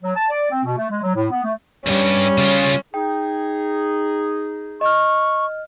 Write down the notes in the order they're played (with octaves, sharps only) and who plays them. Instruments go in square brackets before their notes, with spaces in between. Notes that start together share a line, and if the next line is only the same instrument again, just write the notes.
[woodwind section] F#3
A5
D5
C4
B2
A3
G#3
F#3
A2
B3
A3
[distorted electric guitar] C#2 G2 [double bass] G3 [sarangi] C#4
[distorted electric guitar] C#3 F4
[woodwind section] D#4 G#4 [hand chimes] G5
[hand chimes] D#5 F6 [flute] C#6